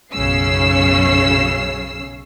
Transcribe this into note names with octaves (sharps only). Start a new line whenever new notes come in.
B1 F#2 C#3 C#4 E6 C7